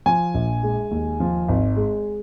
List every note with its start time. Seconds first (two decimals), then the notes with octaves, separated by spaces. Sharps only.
0.06 F3 G#5
0.34 A#1
0.63 G#3
0.91 D#2
1.20 F3
1.48 G#1
1.77 G#3